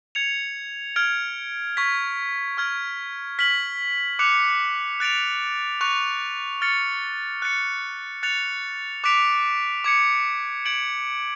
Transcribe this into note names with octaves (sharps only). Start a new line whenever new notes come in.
G#6 C#7 F7
F6 G#6 D7
C#6 G#6 B6
C#6 F6 G#6
F6 B6 F#7
D6 F#6 C#7 F7
F#6 A6 D7 F7
C#6 F#6 C#7 F7
F6 A6 C#7
F#6 A6 C#7
F#6 A6 C#7 F7
D6 F#6 B6 D7 F7
D6 G#6 C#7
G#6 D7 F#7